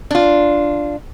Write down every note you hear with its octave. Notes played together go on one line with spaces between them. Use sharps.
D4 F4